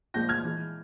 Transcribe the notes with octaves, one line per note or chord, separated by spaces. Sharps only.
A#2 F3 G#3 G6 A#6
F6 G#6
E3 G#3